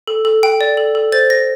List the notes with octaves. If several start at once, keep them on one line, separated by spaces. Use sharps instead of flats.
A4
A4
G5
D5
A4
A4
C5 A6
C5 A#6